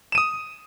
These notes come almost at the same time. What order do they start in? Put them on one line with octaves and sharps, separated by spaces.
E7 D#7 D#6